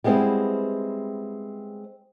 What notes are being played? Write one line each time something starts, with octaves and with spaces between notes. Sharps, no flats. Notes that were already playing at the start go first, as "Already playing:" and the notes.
G3 G#3 B3 C4 E4